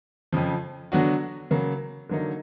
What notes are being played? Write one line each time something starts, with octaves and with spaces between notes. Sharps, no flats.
F2 C#3 F3
D3 F#3 B3 D4 F#4
C#3 F#3 A#3
D3 F#3 A#3 D#4